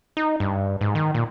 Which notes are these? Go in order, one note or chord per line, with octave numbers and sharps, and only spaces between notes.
D#4
G2
G#2
D#3
A#2